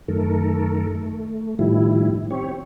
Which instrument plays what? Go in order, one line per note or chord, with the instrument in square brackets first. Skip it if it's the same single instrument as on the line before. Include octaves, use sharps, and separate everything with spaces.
[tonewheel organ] F#2 D#3 A3 A4 A#4
A3
A2 D#3 F3 G3 E4
C4 G4 C#5